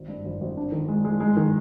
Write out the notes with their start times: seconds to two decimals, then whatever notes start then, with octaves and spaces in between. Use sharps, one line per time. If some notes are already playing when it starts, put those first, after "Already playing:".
Already playing: G#1
0.08 G2
0.25 G#1
0.41 G#1
0.57 D4
0.72 D#3
0.88 G#3
1.05 G#3
1.20 G#3
1.37 D#3